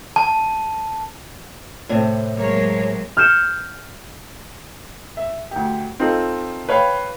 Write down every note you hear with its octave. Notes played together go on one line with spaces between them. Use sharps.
A5
A2 C3
F#3 G#3 A#3 C#5
F6 G6 C#7 E7
E5
D2 G4
C4 D#4 F4 A4
B4 C#5 F5 G5